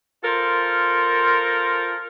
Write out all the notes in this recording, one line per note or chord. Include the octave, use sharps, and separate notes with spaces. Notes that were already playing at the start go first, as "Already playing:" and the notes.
F4 A4 A#4 C5